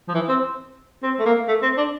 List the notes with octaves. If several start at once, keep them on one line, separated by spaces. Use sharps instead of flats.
F3
E3
C4
C4
A3
A#3
A3
C4
D4